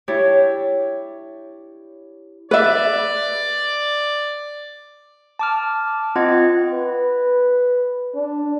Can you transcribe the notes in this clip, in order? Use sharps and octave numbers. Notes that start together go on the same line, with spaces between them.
D4 E4 G4 C#5
B4 D5 E5
A5 D6 F6
C4 F4 D#5 F#5 G#6
B4
D4